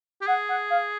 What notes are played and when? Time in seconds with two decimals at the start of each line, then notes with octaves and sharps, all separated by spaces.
0.21 G4
0.27 G#4 F#5
0.49 F#5
0.70 F5